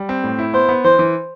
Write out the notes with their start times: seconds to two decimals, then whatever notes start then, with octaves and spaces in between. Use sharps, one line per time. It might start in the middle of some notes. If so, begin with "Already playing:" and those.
Already playing: G3
0.09 C4
0.24 A2
0.39 E4
0.53 B3 C5
0.69 B3
0.84 E3 C5
0.99 E3